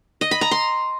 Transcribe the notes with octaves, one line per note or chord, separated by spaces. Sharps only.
D#5
B5
A#5
C6